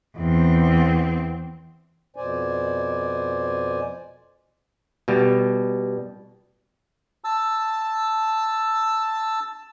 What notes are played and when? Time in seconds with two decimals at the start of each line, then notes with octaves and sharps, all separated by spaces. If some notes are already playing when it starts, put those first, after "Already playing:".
0.17 E2 C4
2.16 F2 B2 C5 D5 G#5
5.08 B2 G3
7.24 A5 E6